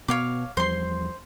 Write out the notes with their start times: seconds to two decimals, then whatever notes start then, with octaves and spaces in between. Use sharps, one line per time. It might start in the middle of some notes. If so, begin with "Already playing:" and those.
0.08 B2 B3 C#5 F5 D6
0.57 E2 F3 G3 C5 C6